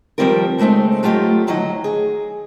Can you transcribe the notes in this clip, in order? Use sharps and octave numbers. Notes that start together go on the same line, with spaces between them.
D#3 F3 G3 C4 F4 A#4
C#3 G#3 A3 C4 D#4
F#3 A3 F4 G4 D#5
D2 D#3 F#3 F#4 D#5
G#4